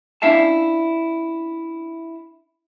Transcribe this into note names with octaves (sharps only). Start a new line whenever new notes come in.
C#4 D4 E4 E5 F5 A5